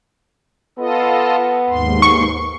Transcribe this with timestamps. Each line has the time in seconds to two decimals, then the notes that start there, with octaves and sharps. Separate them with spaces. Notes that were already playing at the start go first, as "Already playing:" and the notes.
0.79 B3 F4 A4 D#5
1.70 D#2 G#2 C6
2.02 C#6